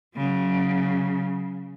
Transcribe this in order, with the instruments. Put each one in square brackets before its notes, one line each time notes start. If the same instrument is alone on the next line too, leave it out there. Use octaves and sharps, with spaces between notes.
[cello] C#3 F#3